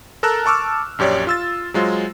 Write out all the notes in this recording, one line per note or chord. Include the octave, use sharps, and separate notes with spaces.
A4 A#4 A5 A#5 E6 F#6
A5 C#6 D6 E6 F6
A#1 F#2 G4 C#5 D5
F4 E6 A6
F#3 G#3 F4 C5